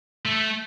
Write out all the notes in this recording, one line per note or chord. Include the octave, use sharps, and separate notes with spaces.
A3